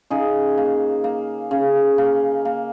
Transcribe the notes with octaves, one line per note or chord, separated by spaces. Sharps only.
C#3 D#4 G#4
A#3
A#3
C#3
A#3
A#3